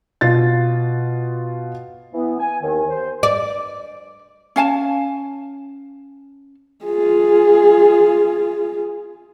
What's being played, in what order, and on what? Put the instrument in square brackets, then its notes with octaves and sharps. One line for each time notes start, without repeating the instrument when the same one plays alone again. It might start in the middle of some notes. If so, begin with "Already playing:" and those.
[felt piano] B2 F4 A6
[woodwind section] E3 B3
G#5
D#2 D#3
C5
[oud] D5
[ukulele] C#4 F5 G#5 A5
[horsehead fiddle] F4 G#4